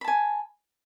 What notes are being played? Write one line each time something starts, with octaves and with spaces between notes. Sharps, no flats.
G#5 A5 B5